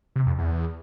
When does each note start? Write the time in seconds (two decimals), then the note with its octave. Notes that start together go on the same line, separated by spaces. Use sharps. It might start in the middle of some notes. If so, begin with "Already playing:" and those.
0.16 C3
0.26 F2
0.39 E2